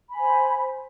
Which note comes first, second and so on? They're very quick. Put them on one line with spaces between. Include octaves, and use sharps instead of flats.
B5 G#5 C5